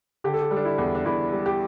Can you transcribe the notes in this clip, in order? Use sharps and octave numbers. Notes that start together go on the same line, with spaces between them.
D3 G4
A4
G4
G3
D4
E4
E2
D4
E2 E4
G3
G4